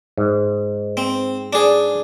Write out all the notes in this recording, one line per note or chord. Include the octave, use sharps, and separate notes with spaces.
G#2
C4
D4 G#4